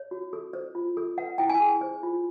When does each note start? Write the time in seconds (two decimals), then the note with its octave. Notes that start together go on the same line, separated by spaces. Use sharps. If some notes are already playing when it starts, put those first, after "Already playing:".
Already playing: C#5
0.11 F#4
0.33 A4
0.53 C5
0.75 F4
0.97 A4
1.18 B4 F#5
1.38 E4 G5
1.49 G#5
1.60 G#4
1.81 C5
2.03 F4